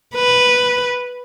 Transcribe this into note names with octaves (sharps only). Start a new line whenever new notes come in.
B4